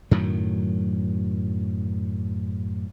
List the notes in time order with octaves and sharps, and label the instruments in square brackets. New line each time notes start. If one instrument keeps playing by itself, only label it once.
[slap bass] F#2 A2 D#3 F#3